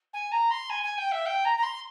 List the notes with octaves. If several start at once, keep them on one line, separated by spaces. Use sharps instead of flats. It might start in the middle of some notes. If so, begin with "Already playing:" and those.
G#5
A#5
C6
G#5
G#5
G5
E5
G5
A#5
A#5
C6